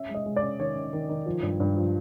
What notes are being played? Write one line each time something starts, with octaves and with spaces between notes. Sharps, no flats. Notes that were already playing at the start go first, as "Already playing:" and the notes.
Already playing: C#4 E5
G#3
D#5
G#3
D5
C#4
D#3 C#5
C#4
D#3
D#3
F3
G2
G2
F3